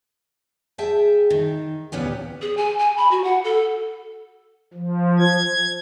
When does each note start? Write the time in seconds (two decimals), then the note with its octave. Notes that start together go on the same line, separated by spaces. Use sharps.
0.78 G#4 E5 G5 A5
1.30 D#3
1.92 D2 A#2 B3 C#4 G4
2.42 G#4
2.57 G#5
2.79 G#5
2.97 B5
3.11 F#4
3.24 F#5
3.44 A4
4.74 F3
5.19 G#6